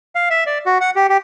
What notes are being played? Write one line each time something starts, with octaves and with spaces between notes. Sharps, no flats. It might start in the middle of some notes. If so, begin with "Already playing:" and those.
F5
E5
D5
F#4
F#5
G4
G4